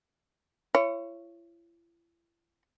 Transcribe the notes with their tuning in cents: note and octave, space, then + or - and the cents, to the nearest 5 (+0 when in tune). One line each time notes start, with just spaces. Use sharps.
E4 +45 C#5 +0